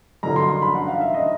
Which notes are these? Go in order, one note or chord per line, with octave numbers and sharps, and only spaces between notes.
G2 D3 F#3 A#5
C6
C6
B5
F#5
F5
E5
D#5